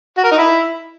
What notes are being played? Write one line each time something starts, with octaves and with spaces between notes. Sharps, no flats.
F#4
A#4
D#4
E4